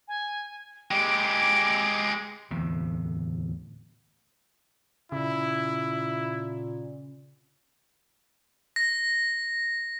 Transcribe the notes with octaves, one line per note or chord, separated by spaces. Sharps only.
G#5
G#3 G4 D6
D1 E2 A2 C3
A#2 C#3 E4
A#6